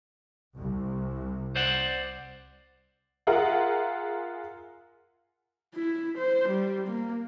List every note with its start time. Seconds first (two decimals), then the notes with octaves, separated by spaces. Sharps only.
0.57 C2
1.56 C5 D5 F#5
3.27 F4 G#4 A#4 E5 F#5 A#5
5.74 E4
6.18 C5
6.49 G3
6.88 A#3